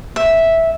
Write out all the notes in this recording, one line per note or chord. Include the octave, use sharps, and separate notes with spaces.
E5